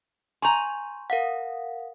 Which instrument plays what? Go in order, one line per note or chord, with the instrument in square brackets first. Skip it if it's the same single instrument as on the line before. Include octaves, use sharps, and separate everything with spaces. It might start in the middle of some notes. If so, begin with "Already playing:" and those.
[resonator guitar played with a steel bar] G#5 A#5 [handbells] C6 C#6 G6
[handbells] A#4 F5 F#5